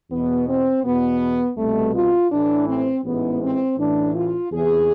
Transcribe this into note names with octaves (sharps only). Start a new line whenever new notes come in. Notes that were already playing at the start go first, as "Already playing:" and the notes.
E2 B2 B3
C4
E2 B2 B3
C2 B2 A3
F4
A1 A2 E3 D4
C4
A1 G#2 E3 B3
C4
A1 A2 E3 D4
F4
E2 C3 E3 G#4